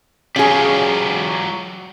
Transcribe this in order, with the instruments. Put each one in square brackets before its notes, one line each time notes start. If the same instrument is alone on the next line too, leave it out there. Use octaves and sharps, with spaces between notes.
[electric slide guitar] F#3 F4 G4 [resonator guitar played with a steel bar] C#4 G#4